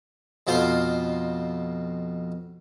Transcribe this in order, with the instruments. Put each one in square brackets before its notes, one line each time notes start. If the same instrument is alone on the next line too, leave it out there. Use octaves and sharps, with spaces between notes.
[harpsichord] F2 B2 F4 C5 F5 C6